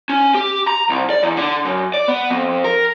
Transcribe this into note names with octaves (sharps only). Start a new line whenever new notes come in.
C#4
G4
A#5
C2
D5
E2
D3
F#2
D5
B3
F2
A#4